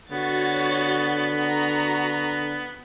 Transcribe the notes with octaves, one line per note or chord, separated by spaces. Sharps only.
D3 B3 F#4 C#5 A6
F#4 A#5